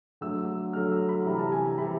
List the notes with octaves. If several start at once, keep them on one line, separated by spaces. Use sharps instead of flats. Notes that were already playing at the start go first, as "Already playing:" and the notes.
D3 F#3 A3 E6
D3 F#3 A3 F6
E6
B5
C3 E3 G3 A#5
A5
G#5
A#5
C3 E3 G3 B5